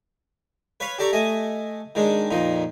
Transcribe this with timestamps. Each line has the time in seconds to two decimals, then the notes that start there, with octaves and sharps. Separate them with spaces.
0.80 B4 C#5 F5 B5
0.98 G4 A4 D5 A#5 C#6
1.13 A3 D#5 G#5
1.95 D#3 G#3 D4
2.31 F2 A#2 D#4